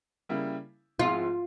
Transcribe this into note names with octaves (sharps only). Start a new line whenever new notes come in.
C#3 G3 A#3 E4
G#2 F3 G#3 C4 E4 F4